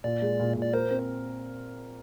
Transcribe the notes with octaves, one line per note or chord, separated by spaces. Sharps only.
A#2 D5
G#3
A#2
A#2
D5
A#4 C5
C4